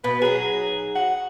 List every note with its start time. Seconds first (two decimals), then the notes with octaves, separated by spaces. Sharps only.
0.04 B2 B4
0.22 F#3 D#4 G#4
0.96 F#5